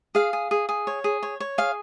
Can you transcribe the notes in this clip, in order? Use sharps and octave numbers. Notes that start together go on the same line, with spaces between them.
G#4 F5
G#4
G#4
G#4
C#5
G#4
C#5
C#5
G#4 F5